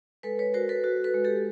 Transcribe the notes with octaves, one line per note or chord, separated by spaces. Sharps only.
G#3 A4 B4
B4 C#5
F#4 A#4 C5
A4 B4
F#4
A4 B4
G#3
G4 A4